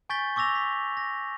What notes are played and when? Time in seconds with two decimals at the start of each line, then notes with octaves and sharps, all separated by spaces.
0.09 G#5 C#6 G6 A6 B6 G7
0.36 C#6 D6 E6 A#6 F7
0.55 B6
0.97 A#6